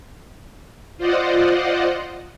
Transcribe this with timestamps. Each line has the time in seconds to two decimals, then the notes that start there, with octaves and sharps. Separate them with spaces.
0.98 F4 C5 D5 D#5 F#5